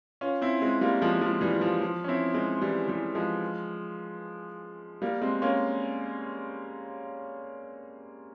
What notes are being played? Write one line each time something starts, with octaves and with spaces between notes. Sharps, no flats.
C#4 F4
C4 E4
G#3 C4
G3 A#3
F3 G#3
F3 G#3
E3 G3
F3
F3
C#4
C4 E4
G#3 C4
E3 G3
E3 G3
F3 G#3
G3 A#3
G#3 C4
A#3 C#4